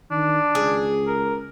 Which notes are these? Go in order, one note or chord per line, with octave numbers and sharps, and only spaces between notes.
D#3 D4
C#2 G#4
A#4